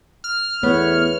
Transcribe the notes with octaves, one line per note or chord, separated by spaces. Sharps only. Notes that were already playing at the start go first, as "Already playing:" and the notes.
F6
E2 A3 B3 B4 C#5